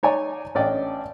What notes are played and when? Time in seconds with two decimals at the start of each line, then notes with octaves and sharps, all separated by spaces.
0.03 D#4 C#5 D5 G#5
0.55 A1 C#4 D4 D5 D#5 G5